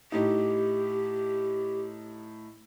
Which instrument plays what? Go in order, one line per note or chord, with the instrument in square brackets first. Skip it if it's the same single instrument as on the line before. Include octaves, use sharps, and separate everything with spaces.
[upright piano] A2 D#4 [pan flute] G4